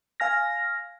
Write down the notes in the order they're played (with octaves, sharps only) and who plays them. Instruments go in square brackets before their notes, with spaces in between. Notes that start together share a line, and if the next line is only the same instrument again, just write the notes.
[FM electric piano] F5 G#5 F6 A#6